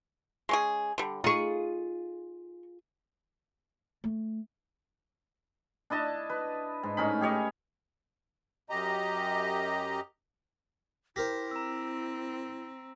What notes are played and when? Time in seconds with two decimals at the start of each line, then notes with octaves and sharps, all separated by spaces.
0.49 G#3 C#4 G#4
0.98 D3 G3
1.24 D#4 F4 G#4 C#6
4.04 A3
5.90 D4 E4 D#5 A5
6.30 B4
6.83 G#2
6.97 A2 C#4 D#4 B5
7.21 G4 G#4 C#5 D#5
8.70 F#2 G4 D#5 A#5
11.16 E4 G4 A#4 C5 A#6 B6
11.51 C4 A#5 E6